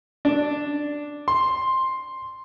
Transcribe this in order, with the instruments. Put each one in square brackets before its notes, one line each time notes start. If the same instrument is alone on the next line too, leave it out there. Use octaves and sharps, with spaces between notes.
[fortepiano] D4
[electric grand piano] C6